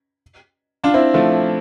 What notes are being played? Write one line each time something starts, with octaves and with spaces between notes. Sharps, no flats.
D4 F4
C4 E4
F3 A3